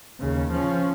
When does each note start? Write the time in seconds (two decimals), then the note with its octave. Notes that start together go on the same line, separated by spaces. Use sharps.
0.20 D#2 C#3
0.51 F3 C#4